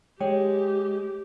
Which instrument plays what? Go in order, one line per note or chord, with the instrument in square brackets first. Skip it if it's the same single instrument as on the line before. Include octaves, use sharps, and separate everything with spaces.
[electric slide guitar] G#3 [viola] G4 [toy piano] C#5 G5